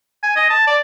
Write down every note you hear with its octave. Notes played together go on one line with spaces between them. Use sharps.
G#5
D#5
A5
D5